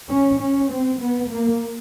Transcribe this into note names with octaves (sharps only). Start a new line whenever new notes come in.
C#4
C#4
C4
B3
A#3